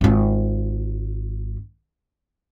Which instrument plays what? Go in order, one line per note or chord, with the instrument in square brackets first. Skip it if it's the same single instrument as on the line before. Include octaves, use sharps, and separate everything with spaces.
[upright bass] G#1 F4